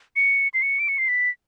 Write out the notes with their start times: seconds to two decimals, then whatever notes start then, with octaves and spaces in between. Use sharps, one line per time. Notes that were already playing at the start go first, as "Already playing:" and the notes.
0.16 C#7
0.54 C7
0.62 C#7
0.80 D7
0.89 C#7
0.98 C7
1.08 B6